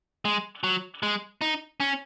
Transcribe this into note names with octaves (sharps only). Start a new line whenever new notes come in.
G#3
F#3
G#3
D#4
C#4